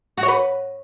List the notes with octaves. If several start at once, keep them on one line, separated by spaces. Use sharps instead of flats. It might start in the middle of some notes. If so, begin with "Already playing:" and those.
F#4
C#5
B4